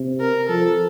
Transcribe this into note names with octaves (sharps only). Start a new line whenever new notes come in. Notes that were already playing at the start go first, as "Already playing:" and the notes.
Already playing: C3
A#4
F3 A4